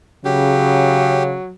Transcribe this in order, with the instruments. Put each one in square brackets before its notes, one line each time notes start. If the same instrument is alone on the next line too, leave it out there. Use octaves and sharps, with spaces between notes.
[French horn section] C#3 [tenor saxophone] F#3 [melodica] G4